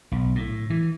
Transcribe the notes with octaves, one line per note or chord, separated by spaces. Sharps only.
B1
A2
E3